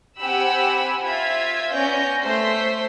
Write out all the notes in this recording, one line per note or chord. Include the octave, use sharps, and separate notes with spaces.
C4 G4 F#5 G#5 B5 E6
F4 C5 E5 G#6 B6
B3 C#4 D5 G6 A#6
A3 C5 C6 B6